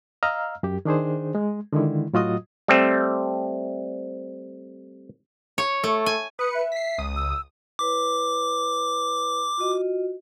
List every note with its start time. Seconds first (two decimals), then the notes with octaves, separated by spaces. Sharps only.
0.23 D#5 F5 A#5 E6 F6
0.63 F#2 G4
0.85 D#3 D4 G#4 C5
1.35 G#3
1.73 D3 D#3 G#3 E4
2.13 A2 F#3 F4 F#4 D#5 D#6
2.68 G3 A3 C4
5.58 C#5
5.84 A3
6.06 G#5
6.39 B4 D#6 C#7
6.55 E5
6.72 B6 C7
6.98 C#2 D#6
7.16 E6
7.79 E4 B4 C#5 D6
9.58 F4 F#4 D#5